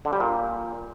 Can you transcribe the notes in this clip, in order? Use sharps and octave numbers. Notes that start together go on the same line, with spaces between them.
D3
G3
A#2